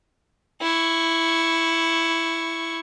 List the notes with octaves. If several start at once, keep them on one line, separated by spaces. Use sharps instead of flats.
E4 C#6